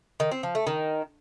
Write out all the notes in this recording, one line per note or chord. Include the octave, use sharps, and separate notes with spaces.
D#3
C4
F3
A3
D#3